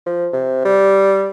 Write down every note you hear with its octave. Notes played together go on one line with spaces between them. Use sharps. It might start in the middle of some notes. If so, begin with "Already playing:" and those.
F3
C3
G3